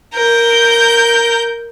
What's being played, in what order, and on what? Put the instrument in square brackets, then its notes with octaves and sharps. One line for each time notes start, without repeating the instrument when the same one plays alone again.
[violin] A#4 G6